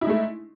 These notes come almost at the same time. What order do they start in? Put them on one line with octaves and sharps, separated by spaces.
E4 D#4 G#3 A3